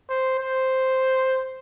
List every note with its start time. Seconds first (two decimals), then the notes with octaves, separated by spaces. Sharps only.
0.10 C5
0.39 C5